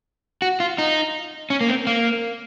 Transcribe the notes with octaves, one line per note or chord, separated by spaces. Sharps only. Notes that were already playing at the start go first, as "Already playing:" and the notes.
F#4
F4
D#4
C#4
A#3
C4
A#3